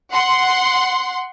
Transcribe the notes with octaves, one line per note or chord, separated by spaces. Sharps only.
F#5 C6